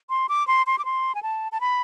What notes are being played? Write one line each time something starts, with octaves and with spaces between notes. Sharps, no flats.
C6
D6
C6
C6
D6
C6
G#5
A5
A5
B5